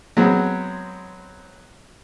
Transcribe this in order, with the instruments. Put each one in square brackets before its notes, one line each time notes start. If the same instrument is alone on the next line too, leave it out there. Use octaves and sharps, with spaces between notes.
[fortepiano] F#3 G#3 B3 C4